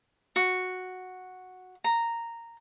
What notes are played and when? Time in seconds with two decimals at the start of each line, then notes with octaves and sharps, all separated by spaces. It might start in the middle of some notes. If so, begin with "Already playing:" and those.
0.36 F#4
1.84 A#5